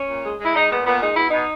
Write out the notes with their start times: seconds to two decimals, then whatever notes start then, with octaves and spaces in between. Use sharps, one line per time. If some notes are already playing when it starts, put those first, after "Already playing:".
Already playing: C#4
0.09 A#2
0.23 G#3
0.40 G#3 E4
0.54 G#3 D#4
0.71 A#2 B3
0.86 A#2 B3
1.01 G#3 D#4
1.15 B2 E4
1.30 B2 D#4